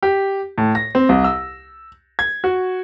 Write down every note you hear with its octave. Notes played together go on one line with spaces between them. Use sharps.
G4
A2
A#6
C4
C2
E6
G#6
F#4